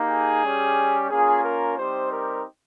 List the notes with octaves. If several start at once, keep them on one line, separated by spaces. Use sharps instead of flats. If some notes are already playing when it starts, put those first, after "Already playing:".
Already playing: A#3 D#4 G4
G#4
G3 C#4 G4
A#3 C#4 F4 G#4
A#4
G3 C4 D#4 G4 C5
A#4